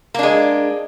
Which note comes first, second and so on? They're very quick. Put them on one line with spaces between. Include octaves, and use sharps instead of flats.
A#3 D4 G#3